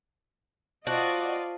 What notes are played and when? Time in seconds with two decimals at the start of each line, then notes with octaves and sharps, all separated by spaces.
0.87 F4 F#4 C5 D5 D#5 A5